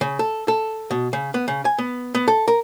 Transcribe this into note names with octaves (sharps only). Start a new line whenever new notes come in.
C#3
A4
A4
B2
C#3
B3
C#3
G#5
B3
B3
A4
A#4